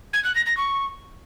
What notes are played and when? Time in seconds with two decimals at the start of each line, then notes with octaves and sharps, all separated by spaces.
0.13 G#6
0.24 F#6
0.35 A#6
0.46 A#6
0.57 C#6